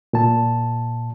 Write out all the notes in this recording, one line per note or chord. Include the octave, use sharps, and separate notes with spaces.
A#2 A5